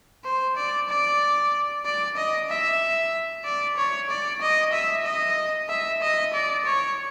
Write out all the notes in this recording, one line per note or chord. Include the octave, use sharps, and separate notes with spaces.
C5
D5
D5
D5
D#5
E5
D5
C#5
D5
D#5
E5
D#5
E5
D#5
D5
C#5